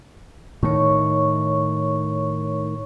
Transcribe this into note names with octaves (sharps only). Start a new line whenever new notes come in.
A2 D#3 C#5 C#6